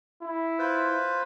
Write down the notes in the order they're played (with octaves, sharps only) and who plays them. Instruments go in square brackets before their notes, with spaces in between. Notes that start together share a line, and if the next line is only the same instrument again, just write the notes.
[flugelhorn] E4
[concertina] F4 B4 C5